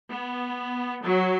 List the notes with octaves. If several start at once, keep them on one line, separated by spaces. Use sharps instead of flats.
B3
F#3